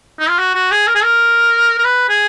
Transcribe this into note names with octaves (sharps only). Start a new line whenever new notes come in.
D#4
F4
F#4
F#4
G#4
A#4
G#4
A#4
A#4
B4
G#4